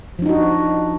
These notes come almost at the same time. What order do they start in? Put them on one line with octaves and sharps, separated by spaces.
F3 D4 D#4 F#4